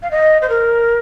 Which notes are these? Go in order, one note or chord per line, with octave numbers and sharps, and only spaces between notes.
F5
D#5
C5
A#4